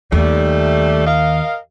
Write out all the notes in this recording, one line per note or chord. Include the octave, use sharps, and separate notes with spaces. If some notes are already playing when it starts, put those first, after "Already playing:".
D#2 G3 A3
A#4 D#5 F5